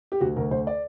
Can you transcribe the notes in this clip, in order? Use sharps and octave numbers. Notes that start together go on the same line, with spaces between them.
G4
D2 F#4
D2 A#4
D2 C5
D5